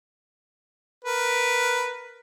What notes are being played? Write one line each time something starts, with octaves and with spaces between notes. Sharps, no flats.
A#4 B4